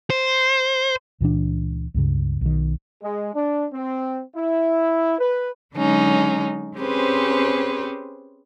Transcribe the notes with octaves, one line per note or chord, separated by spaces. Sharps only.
C5
C#2 A#2 E3 D4
C#2 G2 C#3
B1 D#3
G#3
D4
C4
E4
B4
D3 F#3 G#3 C#4 D#4
C4 C#4 G4 G#4 B4 C5